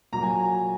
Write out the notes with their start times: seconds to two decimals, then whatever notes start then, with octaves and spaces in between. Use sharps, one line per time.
0.12 A#2 F#3 A#5
0.23 G#5